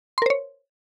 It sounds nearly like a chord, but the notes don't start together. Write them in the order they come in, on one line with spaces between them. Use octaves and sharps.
C6 A#4 C5 C#5